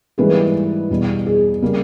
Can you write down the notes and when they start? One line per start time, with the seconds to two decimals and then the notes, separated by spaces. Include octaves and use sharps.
0.18 G#2 E3 G3 A#3 G#4 B4
0.90 E2 B2 G3
1.26 G#4
1.62 C#3 G3 A#3